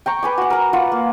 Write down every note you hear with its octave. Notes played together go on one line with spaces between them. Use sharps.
G5 A#5 C#6
B4 G#5 D6
F#4 F#5
A#4 A#5
F4 B4 F#5
A#3